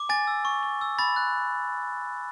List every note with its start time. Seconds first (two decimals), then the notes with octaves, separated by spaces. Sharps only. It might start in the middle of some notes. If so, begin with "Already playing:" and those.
Already playing: D6
0.09 G#5 A6
0.27 E6
0.45 C#6
0.63 C#6
0.81 E6
0.98 B5 A6
1.16 F#6